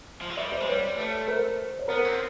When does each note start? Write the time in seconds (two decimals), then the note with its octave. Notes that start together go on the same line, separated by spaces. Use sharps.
0.21 F3
0.29 F#3
0.37 G3 D5 E5
0.52 C5 D5
0.60 G#3
0.67 G3 B4 C#5
0.98 A3
1.27 A#4 C5
1.79 C#5
1.88 B3 A#4 C5
2.05 C4